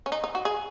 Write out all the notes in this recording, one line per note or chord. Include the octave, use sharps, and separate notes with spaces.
C#4
D#4
D#4
F#4
G#4